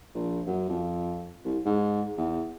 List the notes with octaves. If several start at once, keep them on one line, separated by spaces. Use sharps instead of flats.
A#1
F#2
F2
C2
G#2
E2